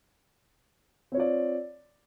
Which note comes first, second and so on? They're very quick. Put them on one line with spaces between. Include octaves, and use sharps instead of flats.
C4 C#5 F4 D5